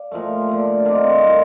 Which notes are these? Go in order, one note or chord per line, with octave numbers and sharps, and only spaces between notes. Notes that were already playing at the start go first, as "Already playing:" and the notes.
Already playing: D5 F5
A#2 F3 A3
D3 A3
C3 D#3 A#3 D4 F4
C4 D#4
A2 G3 A#3